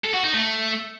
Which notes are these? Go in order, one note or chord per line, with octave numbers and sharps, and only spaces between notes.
A4
F#4
D#4
A3